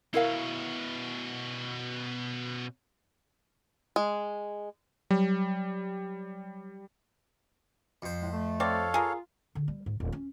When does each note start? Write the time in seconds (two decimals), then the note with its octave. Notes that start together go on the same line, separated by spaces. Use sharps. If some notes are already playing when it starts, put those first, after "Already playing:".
0.14 B2 C#4 E4 A#4 F5
3.96 G#3
5.11 F#3 G3
8.02 F2 C5
8.20 A2 G#3
8.32 A3
8.60 C4 A4 C#5 D5 F5
8.94 F4 G#4 A#4
9.55 D3
9.68 G3
9.86 G#2
10.00 D#1
10.12 C#4